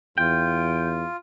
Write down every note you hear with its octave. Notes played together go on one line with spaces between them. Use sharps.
E2 F4 G5